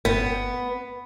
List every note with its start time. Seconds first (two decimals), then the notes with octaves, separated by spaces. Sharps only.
0.05 G1 B3 G5 B6